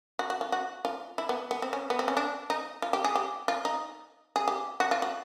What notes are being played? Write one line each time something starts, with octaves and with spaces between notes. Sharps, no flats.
F#4
F#4
F4
F#4
F4
E4
B3
B3
C4
C#4
B3
C4
C#4
D4
D#4
F4
G4
G#4
G4
F4
D#4
G#4
G4
F#4
F4
F#4